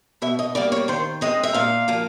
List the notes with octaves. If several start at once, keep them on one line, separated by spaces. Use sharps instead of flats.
B2 E5
D#5
G3 A#3 D5
C#5
D#3 C5
G#3 C4 D#5
E5
A#2 F5
F3 A#3